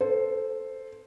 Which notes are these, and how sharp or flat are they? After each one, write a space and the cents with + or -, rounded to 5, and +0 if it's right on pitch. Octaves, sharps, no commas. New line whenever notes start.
A4 +0 C5 +0